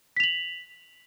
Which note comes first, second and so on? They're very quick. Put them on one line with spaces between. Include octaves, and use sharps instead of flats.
B6 F7 F#7